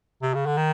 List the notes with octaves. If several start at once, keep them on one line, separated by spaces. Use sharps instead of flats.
C3
C#3
D3
D#3